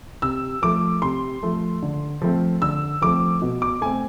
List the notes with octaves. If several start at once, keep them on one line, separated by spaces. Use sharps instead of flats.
C3 E6
F3 A3 D6
C3 C6
F3 A3
D3
F3 A3 C4
D3 E6
F3 A3 C4 D6
B2
D6
A3 C4 G#5